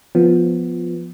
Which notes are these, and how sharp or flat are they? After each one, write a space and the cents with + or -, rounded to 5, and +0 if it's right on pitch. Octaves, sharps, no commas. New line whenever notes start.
F3 +0 B3 +0